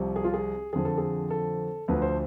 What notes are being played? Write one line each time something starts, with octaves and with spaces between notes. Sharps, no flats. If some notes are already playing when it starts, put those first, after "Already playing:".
Already playing: C2 C3 F3
G#4
F4
G#4
F2 D3 F3 G#4
A4
G#4
A4
D2 D3 F3 B4
C5